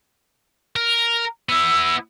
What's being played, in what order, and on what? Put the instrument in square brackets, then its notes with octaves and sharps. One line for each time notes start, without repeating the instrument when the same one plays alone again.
[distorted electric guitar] A#4
[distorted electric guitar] B3 E4 [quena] E6